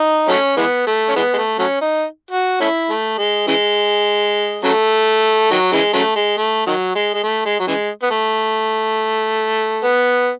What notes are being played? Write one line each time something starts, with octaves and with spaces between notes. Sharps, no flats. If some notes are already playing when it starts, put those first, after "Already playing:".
Already playing: D#4
F#3 A3 C#4
E3 G#3 B3
A3
C#4
E3 G#3 B3
G#3
A3
F#3 A3 C#4
D#4
F#4
A3 C#4 E4
A3
G#3
C#3 E3 G#3
C#3 F#3 A3
D#3 F#3
C#3 E3 G#3
C#3 F#3 A3
G#3
A3
D#3 F#3
G#3
G#3
A3
G#3
F#3
C#3 E3 G#3
B3
A3
B3